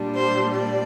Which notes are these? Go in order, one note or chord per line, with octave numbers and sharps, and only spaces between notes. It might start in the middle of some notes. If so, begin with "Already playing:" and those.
Already playing: A#2 G3 D4
C5
D5